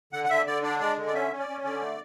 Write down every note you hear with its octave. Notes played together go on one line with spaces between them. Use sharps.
D3 F#5
F#5
D3 E5
D3 D5
D4 D5
G#3 D5
D3
D5
C#4 E5
C#4
D5
C#4
D3 D5
A3